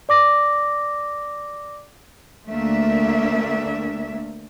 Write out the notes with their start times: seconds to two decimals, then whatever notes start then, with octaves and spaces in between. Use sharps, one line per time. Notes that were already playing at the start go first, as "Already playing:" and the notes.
0.09 D5 D6 A#6
2.49 D2 A3 A#3 D4 E5